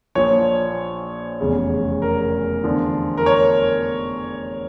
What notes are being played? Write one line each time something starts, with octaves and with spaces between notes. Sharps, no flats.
A#1 A#2 F3 C#5
F1 E2 C#3
A#4
E2 D3 F3
A#4
C#5